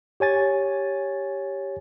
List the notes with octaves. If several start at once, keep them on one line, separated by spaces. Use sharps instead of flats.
G4 C#5 G#5 A6